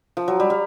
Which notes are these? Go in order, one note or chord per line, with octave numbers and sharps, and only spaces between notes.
F3
F#3
G3
G3